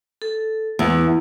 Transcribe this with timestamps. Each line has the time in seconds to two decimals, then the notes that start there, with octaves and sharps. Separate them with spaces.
0.22 A4
0.79 E2 B4